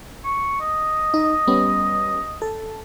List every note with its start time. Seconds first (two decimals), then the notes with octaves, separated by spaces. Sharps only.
0.24 C#6
0.60 D#5
1.14 D#4
1.47 G3 B3 C#4
2.42 A4